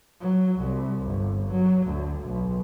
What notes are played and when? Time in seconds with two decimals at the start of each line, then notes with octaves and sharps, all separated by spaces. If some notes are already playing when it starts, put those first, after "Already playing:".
0.21 F#3
0.59 C2
1.07 G1
1.51 F#3
1.87 D2
2.27 B1